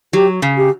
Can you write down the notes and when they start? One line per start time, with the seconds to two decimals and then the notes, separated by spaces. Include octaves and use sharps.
0.13 F#3 G4
0.42 C#3
0.57 G4